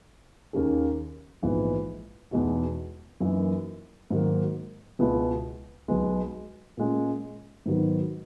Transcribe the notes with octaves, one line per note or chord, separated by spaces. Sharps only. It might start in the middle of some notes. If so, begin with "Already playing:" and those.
D#2 D#3 A#3 C#4 G#4
A#1 G#2 E3 G#3 B3
E2 B2 G#3 D#4 F#4
F#2 E3 A#3 D#4
G#2 D#3 F#3 A#3
C#2 B2 G#3 B3 E4
B1 B2 G#3 B3
A#2 G#3 C#4
G#2 D#3 F#3 B3